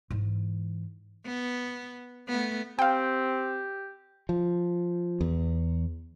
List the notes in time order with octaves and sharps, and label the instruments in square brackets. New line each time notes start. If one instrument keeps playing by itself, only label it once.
[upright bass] G#2 E3
[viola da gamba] B3
A3 B3
[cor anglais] C4 [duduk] G4 [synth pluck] F5 G5
[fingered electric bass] F3
E2